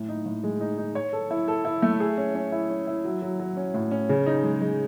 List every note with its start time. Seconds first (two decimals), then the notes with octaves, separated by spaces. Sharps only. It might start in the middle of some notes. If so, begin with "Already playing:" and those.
Already playing: A2
0.09 D#4
0.26 A2
0.43 G#3
0.61 D#4
0.78 D#4
0.95 C#5
1.13 A4
1.31 E4
1.48 A4
1.65 E4
1.82 A3
2.00 G#4
2.18 C#4
2.35 C#4
2.52 E4
2.70 C#4
2.87 E4
3.05 F#3
3.22 F#3
3.40 F#3
3.57 C#4
3.74 A2
3.91 C#4
4.09 C#3
4.26 D#4
4.44 G#3
4.61 G#3